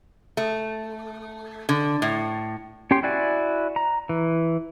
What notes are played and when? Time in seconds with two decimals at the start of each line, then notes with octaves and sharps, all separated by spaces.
0.37 A3
1.69 D3
2.02 A2
2.91 C#4 G4 G5 C6
3.03 E4 F#4 D5 G#5
3.76 A#5
4.09 E3